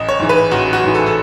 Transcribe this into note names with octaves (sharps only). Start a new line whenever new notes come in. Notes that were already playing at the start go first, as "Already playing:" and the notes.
Already playing: A1 D#5
C#5
G#2 E3
B4
A1 F#4
F#4
G#2 E3
A4
A4